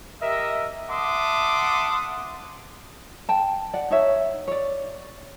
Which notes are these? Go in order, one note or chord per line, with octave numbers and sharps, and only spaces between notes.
G4 A#4 D#5 E5
E5 F#5 A5 C6 D6 D#6
G5 A5
D5 F#5
D#4 C#5 E5
C#5 D5